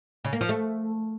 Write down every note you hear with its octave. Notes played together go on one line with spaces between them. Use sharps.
C#3
A#3
F3
A3